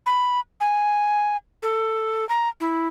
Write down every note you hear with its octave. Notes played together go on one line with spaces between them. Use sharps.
B5
G#5
A4
A#5
E4